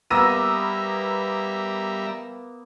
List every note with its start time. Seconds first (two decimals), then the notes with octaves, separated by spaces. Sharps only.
0.11 G3 A#3 B3 E5 A#5 E6 A#6 D#7